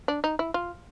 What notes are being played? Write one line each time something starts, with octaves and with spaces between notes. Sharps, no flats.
D4
D#4
E4
F4